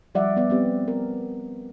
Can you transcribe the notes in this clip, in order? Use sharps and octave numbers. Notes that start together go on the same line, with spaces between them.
F3 G3 D5 E5 F#5
B3 D5
B3 C4 G4
A#4